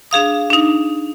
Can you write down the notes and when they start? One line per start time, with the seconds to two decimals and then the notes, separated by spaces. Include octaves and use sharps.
0.11 D4 G#4 F5 D#6
0.50 D4 D#4